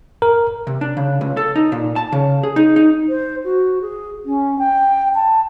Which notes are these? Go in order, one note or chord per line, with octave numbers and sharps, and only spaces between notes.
A#4
C3
D4
C#3
C#2
A4
D#4
A#2
A5
C#3
G#4
D#4
D#4
C5
F#4
G#4
C#4
G5
A5